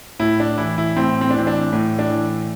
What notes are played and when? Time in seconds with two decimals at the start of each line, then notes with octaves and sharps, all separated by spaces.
0.20 A2 E4
0.40 D4
0.58 E3 E4
0.78 E4
0.96 A2 C4
1.21 C4
1.30 D4
1.34 E3 C4
1.47 D4
1.72 A2
1.99 D4
2.11 E3